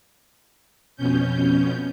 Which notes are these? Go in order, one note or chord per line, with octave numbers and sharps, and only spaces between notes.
F2 B2 C#4 G6